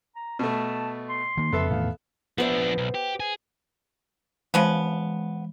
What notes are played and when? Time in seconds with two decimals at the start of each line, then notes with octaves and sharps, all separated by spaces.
0.15 A#5
0.39 B2 A3 A5
1.09 C6
1.37 D#3 A#3
1.53 F2 C#3 B3 A4 E5
1.70 E2 A2 D#3 F5
2.38 F3 B3 D4 C5 E5
2.78 B1
2.94 G4
3.20 G#4
4.54 C#3 E3 F3 G#3 B3